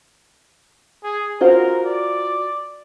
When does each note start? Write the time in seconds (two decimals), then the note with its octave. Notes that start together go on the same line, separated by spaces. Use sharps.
1.04 G#4
1.41 F4 F#4 A#4 C5
1.86 D5